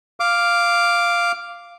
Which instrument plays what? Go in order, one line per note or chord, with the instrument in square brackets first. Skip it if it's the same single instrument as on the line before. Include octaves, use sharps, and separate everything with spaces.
[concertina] F5 D6